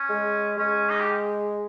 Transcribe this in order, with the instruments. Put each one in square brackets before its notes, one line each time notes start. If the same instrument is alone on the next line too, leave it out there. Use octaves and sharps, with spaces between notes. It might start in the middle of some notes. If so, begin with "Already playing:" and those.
Already playing: [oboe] C#4
[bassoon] G#3
[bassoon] G#3 [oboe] C#4
[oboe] D#4
G4